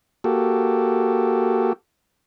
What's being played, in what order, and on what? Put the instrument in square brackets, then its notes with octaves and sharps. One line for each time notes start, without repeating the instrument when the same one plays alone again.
[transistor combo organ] A#3 F#4 G4 A4